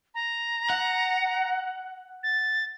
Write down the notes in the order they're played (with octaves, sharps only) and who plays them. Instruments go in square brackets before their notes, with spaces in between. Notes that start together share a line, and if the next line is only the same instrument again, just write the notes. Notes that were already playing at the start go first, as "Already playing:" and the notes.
[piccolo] A#5
[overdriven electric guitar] F#5
[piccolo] A6